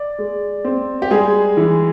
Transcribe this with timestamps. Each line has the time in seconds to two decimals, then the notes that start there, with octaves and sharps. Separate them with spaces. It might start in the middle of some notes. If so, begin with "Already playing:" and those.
Already playing: D5
0.19 G#3
0.65 C4
1.02 G4
1.11 G3 G#3 G#4
1.57 E3